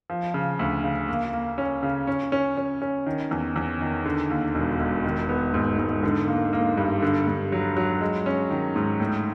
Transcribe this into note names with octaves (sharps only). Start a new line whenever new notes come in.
F3
C#3
D2
C#3
A#3
A#3
C#4
C#3
C#4
C#4
C#4
C#4
D#3
E2
E2
D#3
D3
D#2
E1
E1
D#3
B3
G#2
G#2
D3
A#3
A#3
G2
D3
G2
F#3
F#3
G#3
C#4
D#3
G#2
A2